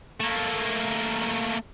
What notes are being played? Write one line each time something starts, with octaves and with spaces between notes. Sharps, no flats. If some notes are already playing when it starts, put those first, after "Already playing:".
A3 A#3